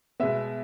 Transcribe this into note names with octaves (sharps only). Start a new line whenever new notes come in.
B2 G#3 B3 E5